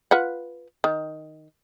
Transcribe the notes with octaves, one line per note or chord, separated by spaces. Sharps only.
F4 B4 F#5
D#3